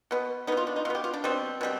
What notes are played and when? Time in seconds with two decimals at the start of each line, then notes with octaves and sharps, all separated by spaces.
0.11 B2 B3
0.47 B2 B3 D#4
0.57 F4
0.67 D4
0.76 D#4
0.85 B2 F4
0.90 B3 G4
1.04 F4
1.14 D4
1.24 B2 G3 C4
1.61 B2 G3 C4